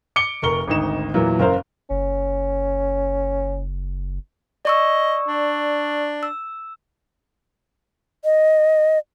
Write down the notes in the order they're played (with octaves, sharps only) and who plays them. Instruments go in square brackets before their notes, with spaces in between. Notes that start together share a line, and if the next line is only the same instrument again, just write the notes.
[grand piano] D6 C#7 D7 G7
F1 A#4 C#6 G7
G#1 D2 D#4 E7
E2 A#2 E3 F#3 A#3
F#1 F#2 A#4 C5 F5
[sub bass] F#1 [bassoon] C#4
[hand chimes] D5 C#6 E6 [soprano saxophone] D#5
[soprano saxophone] D4
[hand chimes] E6
[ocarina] D#5